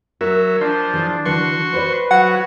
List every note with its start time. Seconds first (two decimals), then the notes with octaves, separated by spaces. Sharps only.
0.21 F#3 A#4 E5
0.61 F3 D4 C5
0.94 E3 G#4
1.25 D3 E3 F#4 B4 C6 C#6
1.74 B4 C5 D5
2.11 F#3 F#4 F#5